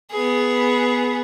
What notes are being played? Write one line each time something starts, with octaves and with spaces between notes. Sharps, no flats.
B3 G#4